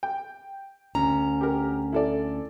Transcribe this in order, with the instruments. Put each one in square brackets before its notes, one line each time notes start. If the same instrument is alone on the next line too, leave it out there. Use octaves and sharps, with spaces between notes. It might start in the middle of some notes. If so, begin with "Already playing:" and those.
[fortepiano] G5
[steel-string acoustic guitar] D2 C#4 A#5
[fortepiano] G4 A#4
E4 A4 D5